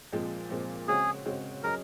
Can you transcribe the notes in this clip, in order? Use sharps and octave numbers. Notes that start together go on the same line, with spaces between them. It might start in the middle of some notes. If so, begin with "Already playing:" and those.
A#2 F3 G#3 C4
A#2 F3 G#3 C4
C#3 G#3 C4 F#4 G#4 C#5
C#3 G#3 C4 F#4 C#5
F#3 C#4 G#4 A#4 D#5